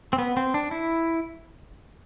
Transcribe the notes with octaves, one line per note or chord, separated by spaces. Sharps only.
C4
B3
C4
D4
E4